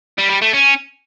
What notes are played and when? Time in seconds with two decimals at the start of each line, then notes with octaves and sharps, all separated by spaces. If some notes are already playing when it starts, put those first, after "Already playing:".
0.18 G3
0.30 G3
0.42 A3
0.54 C#4